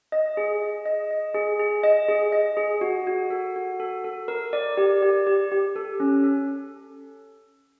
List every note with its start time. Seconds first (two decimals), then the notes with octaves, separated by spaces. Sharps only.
0.12 D#5
0.37 G#4
0.62 D#5
0.86 D#5
1.11 D#5
1.35 G#4
1.59 G#4
1.83 D#5
2.09 G#4
2.32 D#5
2.57 G#4
2.81 F#4
3.07 F#4
3.30 A4
3.56 F#4
3.80 A4
4.04 A4
4.28 A#4
4.53 D5
4.77 G4
5.02 G4
5.27 G4
5.52 G4
5.76 A4
6.00 C#4
6.24 A4